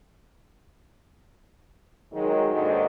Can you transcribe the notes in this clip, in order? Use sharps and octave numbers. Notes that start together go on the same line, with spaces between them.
D#3 F#3 G#3
D#2 G#2 F#3 D4 A4 D#5